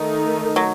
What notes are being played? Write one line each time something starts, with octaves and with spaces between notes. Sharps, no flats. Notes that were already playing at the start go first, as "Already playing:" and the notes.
Already playing: D#3 A3 D#4
F#3